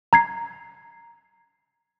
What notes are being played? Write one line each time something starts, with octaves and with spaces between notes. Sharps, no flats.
A#5 G#6 C7